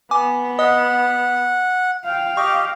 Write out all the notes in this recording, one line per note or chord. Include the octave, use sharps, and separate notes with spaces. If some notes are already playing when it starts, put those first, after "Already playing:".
B3 G#5 D6
D#5 F#5 D#6
F5 G5
G4 D#5 C#6